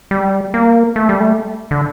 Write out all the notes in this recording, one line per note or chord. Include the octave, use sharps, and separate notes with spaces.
G3
A#3
A3
G3
A3
D3